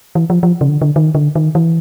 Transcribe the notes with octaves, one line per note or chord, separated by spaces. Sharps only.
E3
F3
F3
C#3
D3
D3
D#3
D3
D#3
E3